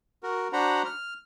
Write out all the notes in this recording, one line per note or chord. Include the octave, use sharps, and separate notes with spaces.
F#4 A#4
D4 F#4 C5 F#5 A#5 B5
F6